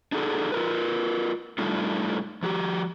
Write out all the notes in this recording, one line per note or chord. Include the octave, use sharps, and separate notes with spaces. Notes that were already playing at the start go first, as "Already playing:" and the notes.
D4 D#4 F#4 G#4 A4
F4 A#4 B4
A2 G3 A3 D4 D#4 F4
F3 F#4 G4